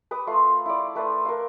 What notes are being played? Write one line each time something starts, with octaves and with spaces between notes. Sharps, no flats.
B4 D6 D#6
A3 F4 C6
E4 D5
A3 B4 C5 D5
A#4 F5